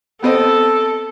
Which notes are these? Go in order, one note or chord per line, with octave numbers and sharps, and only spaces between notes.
B3 C4 A4 D#5